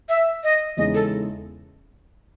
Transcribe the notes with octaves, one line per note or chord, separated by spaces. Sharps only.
E5
D#5
E2 C#3 E3 G#3 D#4 D#5
A4